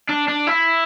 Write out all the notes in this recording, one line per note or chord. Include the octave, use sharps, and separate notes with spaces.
D4
D4
E4